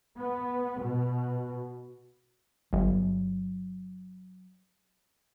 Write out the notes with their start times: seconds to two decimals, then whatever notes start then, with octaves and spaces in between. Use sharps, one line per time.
0.18 B3
0.81 B2
2.73 G1 F#3